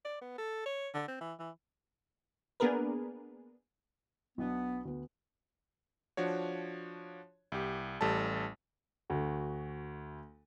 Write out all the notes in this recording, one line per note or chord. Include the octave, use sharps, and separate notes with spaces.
D5
B3
A4
C#5
D3
C4
E3
E3
A#3 B3 D4 G#4 A#4 B4
B1 B3 D4
D2 B3
F3 D4 F#4 C#5
C2 G4
A1 G3 A4 A5
D2 F#4